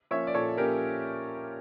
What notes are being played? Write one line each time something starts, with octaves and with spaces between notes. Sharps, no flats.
F3 A#3 C#4 C#5 E5
D5
A#2 A4 C#5
F3 A#3 C#4 G4 A#4